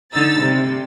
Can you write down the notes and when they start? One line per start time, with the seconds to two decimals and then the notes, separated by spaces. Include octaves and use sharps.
0.12 D3 D#4 E6 A6
0.41 C3 G3